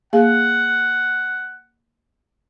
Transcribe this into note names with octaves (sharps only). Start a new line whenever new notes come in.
A#3 G#4 F5 F#5